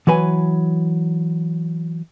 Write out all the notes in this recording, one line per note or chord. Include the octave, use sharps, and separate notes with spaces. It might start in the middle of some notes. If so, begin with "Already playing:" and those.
E3 F#3 B4 G#5